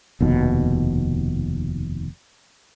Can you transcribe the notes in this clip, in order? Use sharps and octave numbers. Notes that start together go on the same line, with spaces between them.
F1 D#2 B2